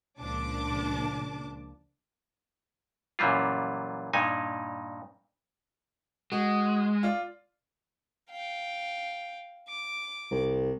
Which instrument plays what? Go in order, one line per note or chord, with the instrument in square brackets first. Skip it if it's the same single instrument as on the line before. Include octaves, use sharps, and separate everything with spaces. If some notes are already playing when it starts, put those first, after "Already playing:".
[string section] C#2 A#2 F3 D4 A5 D6
[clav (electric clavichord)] F#2 A#2 E3 G3 F4
G2 A#2 D#4 G#5
[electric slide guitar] G#3 [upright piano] F#4
[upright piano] F4 D5
[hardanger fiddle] F5 G5
D6
[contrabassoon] C2